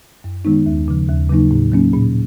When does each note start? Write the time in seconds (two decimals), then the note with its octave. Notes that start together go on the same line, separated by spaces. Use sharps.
0.24 F#2
0.45 D#3 G#3 B3 D#4
0.66 D#2
0.88 C#3 F3
1.08 D#2
1.30 C#3 F#3 A#3 D#4
1.51 A2
1.72 F#3 A#3 C#4
1.93 A#2